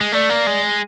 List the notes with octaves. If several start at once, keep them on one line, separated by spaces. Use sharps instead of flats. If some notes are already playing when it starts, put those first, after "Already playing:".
G#3
A3 D5
A#3
G#3